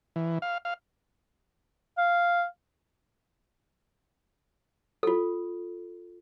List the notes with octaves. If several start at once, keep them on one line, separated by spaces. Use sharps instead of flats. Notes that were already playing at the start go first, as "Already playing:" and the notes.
E3
F5
F5
F5
F4 A4